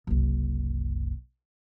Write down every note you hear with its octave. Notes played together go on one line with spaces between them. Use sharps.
F#1 C2